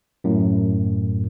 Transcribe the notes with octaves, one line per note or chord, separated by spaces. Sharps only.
F#2 A2